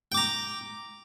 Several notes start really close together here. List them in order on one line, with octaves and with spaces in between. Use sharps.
G5 D6 A#5